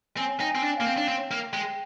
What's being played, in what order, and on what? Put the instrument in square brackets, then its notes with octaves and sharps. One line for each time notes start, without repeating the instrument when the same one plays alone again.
[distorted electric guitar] C4 [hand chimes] G#5
[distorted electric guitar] D#4 [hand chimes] G5
[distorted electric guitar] C4 [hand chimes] G#5
[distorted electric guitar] D4
[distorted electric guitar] A#3 [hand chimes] F5
[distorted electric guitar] C4 [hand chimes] G5
[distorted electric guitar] D4
C4
A#3
[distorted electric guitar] G#3 [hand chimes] G5